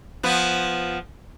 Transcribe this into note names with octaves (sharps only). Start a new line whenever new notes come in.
F3 B3